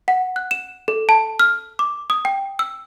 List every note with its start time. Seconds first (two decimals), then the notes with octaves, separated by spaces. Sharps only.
0.08 F#5
0.36 F#6
0.51 E7
0.88 A4
1.09 A5
1.40 F6
1.79 D6
2.10 D#6
2.25 G5
2.59 E6